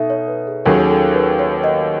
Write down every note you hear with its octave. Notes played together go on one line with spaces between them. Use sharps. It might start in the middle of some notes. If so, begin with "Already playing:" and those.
Already playing: B2 D#4 A4 E5
C#5
B4
G#4
D#2 D#3 F#3 C#4 G#4 A4
A4
B4
C#5
D#5